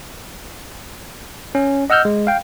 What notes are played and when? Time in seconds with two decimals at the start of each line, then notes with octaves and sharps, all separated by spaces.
1.55 C#4
1.90 D#5 F#5 E6 F6 G6
2.05 G#3
2.27 F5 G5